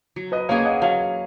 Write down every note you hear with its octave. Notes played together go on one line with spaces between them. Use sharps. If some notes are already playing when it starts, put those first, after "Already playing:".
F#3
B4 D#5
A#3 C#4 G#4 C#5 F5
D#5 F#5
F#3 C#5 F5